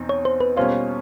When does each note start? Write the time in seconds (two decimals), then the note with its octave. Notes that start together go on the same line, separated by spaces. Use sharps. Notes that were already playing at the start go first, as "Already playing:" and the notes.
Already playing: E2 B2 C4 D#4
0.09 C#5
0.25 C5
0.41 B4
0.56 B2 G3 A#3 C#4 F4 C5